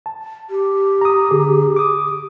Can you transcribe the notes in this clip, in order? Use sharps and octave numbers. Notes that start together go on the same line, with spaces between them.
A5
G4
A#5 D#6
D3 G#4
D6 D#6